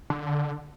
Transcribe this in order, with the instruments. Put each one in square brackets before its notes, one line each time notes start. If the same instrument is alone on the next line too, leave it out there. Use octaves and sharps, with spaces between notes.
[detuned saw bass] D3